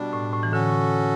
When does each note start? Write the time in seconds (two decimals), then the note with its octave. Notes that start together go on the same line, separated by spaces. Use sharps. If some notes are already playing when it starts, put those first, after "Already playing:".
Already playing: B2 G3 D4
0.13 A2
0.33 A2
0.43 E3
0.52 D3 C#4 F#4 A4